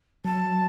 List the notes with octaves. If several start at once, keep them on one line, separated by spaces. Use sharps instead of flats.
F#3 A5